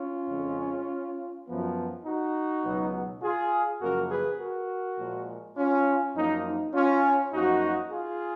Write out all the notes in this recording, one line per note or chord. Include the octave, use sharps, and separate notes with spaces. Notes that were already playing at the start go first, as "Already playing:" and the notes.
Already playing: C#4 F4
F2 C#3 G#3
F#2 F3 B3
D#4 F#4
C#2 B2 F#3 B3
F4 G#4
F#2 C#3 F3 A#3 F#4 A#4
G#4 B4
F#4 A#4
A#2 F3 G#3
C#4 F4
F#2 F3 A#3 D#4
D#4
C#4 F4
F#2 F3 A#3 D#4 F#4
F4 G#4